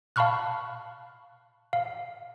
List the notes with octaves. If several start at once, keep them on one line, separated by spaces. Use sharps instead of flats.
F5 A5 B5 C#6 F6 F#6
F5